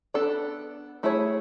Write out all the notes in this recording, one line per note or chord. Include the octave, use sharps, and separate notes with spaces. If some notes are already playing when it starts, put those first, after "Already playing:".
B3 D4 A4 D5
A3 E4 G#4 C#5